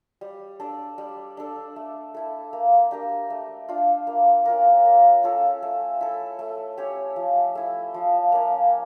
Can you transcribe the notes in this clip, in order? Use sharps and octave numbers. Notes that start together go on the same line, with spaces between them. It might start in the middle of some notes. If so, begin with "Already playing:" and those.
G3
D4 A4 D5
G3
D4 A4
A3
E4 A4
A#3
D4 G4 A#4
A3
D4 F4
A#3
C#4 F4 A#4
A#3
C#4 F4 A4
A3
E4 A4
A3
C#4 G4 C#5
F3
A3 E4
F3
A#3 C#4